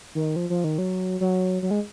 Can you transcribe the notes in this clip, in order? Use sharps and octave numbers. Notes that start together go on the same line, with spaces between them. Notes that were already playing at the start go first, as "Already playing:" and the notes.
D#3
F3
F3
D#3
F#3
F#3
F#3
G#3